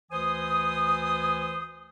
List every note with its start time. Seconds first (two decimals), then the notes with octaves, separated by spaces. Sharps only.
0.11 D2 E3 C5 G#5 D#6